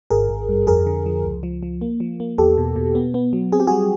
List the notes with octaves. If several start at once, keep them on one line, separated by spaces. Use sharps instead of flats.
G#1 G#4 A#4
G#1
G2
F2 G#4 A#4
D3
F3
C#2
F3
F3
A#3
F3
A#3
E2 G4 A4
B2
B2
B3
B3
F#3
C4 G#4
G4
G3 F#4 G#4